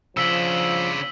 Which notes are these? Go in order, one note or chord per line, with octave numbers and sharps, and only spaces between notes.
C#3 F3 D4 E6 B6 F#7